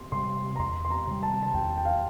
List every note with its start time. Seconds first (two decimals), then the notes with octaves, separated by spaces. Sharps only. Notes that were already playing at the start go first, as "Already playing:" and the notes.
Already playing: C6
0.12 C3 G3 C6
0.56 A#5
0.59 E2 C6
0.85 C6
0.90 A#5
1.07 C3 G3
1.23 A5
1.43 A5
1.54 E2 G5
1.77 G5
1.85 F5